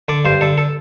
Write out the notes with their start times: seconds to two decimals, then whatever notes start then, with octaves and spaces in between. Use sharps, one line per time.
0.08 D3 D5
0.25 G2 C5
0.41 D3 A4
0.58 A4